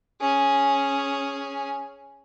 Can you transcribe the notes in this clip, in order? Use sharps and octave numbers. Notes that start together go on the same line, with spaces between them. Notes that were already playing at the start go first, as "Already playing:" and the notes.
C#4 G#4